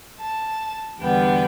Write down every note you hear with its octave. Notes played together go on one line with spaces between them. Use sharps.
A5
E2 D3 G3 B3 G5